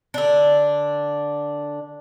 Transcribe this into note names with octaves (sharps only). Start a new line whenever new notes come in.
D3 D4